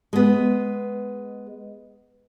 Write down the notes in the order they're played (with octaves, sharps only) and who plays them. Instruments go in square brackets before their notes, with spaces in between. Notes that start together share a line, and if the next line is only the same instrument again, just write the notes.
[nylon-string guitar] G#3 B3